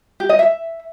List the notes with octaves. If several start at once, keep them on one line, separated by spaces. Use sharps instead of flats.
G4
D#5
E5